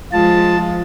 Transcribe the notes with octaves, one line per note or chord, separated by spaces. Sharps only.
F3 G#3 F4 A5